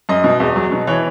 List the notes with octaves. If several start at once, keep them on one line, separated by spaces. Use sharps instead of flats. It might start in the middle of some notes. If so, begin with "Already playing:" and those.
F#2 D#5
B2
E2
F#3
B2
E3 C#5